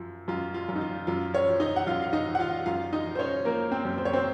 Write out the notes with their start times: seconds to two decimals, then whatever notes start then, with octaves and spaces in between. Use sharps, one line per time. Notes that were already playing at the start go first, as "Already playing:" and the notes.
Already playing: F#2 F3
0.28 F#2 F4
0.54 F4
0.69 F#2
0.76 D#4
0.81 F4
1.07 F#2 F4
1.34 C#4 C#5
1.48 F3
1.60 D#4 D#5
1.76 F#5
1.87 F#2 F4 F5
2.02 F5
2.13 D#4 D#5
2.27 F3
2.35 F#5
2.40 F4 F5
2.66 F#2 F4 F5
2.93 D#4 D#5
3.06 F3
3.15 C5
3.19 C#4 C#5
3.45 F3 A#3 A#4
3.72 C4 C5
3.85 F#2
3.98 C5
4.05 C#5
4.13 C4 C5